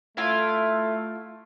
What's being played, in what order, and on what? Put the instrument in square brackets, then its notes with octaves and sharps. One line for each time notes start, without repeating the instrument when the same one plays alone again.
[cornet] A3 [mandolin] E4 F4 F5